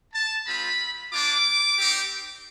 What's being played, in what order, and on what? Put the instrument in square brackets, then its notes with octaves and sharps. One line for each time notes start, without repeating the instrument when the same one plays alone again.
[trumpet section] A5
G#3 C4 F4 B5
A#3 D4 F4 D6
C4 D#4 G4